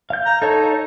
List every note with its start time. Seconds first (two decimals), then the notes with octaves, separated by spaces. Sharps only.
0.10 F5 G6
0.26 A#5
0.42 D#4 A4 C#5